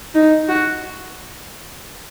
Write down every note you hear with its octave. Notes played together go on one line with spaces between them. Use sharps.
D#4
F#4